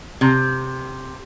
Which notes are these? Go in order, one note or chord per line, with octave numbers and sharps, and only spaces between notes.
C3